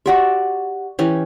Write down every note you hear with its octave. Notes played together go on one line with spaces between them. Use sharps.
F#4 G4 D5 E5 F#5
E3 C#4 G4